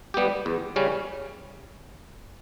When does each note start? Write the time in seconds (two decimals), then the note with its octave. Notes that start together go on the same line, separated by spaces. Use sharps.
0.14 G3 B3 G4
0.46 E2
0.76 C#3 G3 C#4